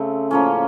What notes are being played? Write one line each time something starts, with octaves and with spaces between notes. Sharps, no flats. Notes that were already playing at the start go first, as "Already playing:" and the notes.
Already playing: C#3 A3 C4
A2 F3 A#3 C#4